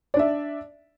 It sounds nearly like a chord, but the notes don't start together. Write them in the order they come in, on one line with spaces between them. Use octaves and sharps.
D5 D4 E5